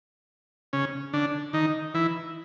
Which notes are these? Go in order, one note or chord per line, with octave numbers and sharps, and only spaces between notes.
C#3 C#4
D3 D4
D#3 D#4
E3 E4